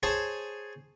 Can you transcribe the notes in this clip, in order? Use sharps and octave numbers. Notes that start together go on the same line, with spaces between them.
G#4 C5 C#5 G#5 A5